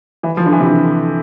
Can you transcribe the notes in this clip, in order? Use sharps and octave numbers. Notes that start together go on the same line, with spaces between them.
E3
F3
D3
E3
C3
D3